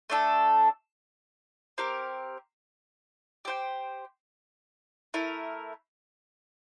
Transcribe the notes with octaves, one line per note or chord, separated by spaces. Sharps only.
A3 D4 A4
C4 G4 A#4
G4 C5 G5
A3 E4 A#4